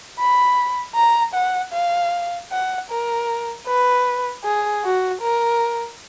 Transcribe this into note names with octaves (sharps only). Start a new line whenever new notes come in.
B5
A#5
F#5
F5
F#5
A#4
B4
G#4
F#4
A#4